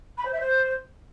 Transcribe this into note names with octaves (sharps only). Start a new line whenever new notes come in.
B5
C5
E5
C5